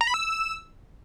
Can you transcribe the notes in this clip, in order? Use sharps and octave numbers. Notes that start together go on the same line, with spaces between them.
A#5
B5
E6